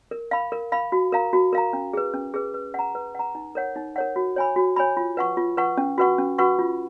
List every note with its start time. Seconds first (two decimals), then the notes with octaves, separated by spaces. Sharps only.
0.11 A#4
0.31 F5 B5
0.52 A#4
0.72 F5 B5
0.92 F#4
1.12 A#4 F5 A#5
1.33 F#4
1.53 A#4 F5 A#5
1.73 C#4
1.93 G#4 B4
2.14 C#4
2.34 G#4 B4
2.54 B4
2.74 F#5 A#5
2.95 B4
3.15 F#5 A#5
3.35 D#4
3.55 A#4 C#5 F#5
3.76 D#4
3.96 A#4 C#5 F#5
4.16 F#4
4.36 C#5 G#5 B5
4.56 F#4
4.76 C#5 G#5 B5
4.97 F4
5.17 B4 F#5 C#6
5.37 F4
5.57 B4 F#5 C#6
5.77 C#4
5.98 F#4 B4 F#5 C#6
6.18 C#4
6.38 F#4 B4 F#5 C#6
6.59 F4